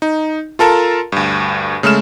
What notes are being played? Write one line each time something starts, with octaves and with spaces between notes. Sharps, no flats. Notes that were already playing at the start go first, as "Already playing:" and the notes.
D#4
F4 A4 A#4 A5
D2 G2
C#3 G#3 A3 F6 E7